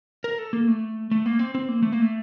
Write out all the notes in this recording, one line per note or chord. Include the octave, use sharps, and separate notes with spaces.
A#4
A4
A#3
A3
A3
A#3
C4
C4
A#3
A3
A#3
A3